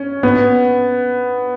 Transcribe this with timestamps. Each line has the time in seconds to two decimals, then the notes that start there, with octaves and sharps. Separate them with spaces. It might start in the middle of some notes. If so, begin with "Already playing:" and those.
Already playing: C#4
0.23 B3